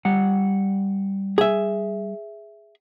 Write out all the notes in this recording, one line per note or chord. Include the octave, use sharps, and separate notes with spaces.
G3 F#5
G#4 E5